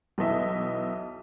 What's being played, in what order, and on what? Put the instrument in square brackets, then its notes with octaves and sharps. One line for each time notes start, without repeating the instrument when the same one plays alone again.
[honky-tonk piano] B1 E3 D#5 E5